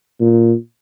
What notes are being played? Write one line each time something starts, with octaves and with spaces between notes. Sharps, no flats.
A#2